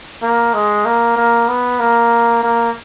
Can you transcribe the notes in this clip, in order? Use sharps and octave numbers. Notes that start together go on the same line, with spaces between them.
A#3
G#3
A#3
A#3
B3
A#3
A#3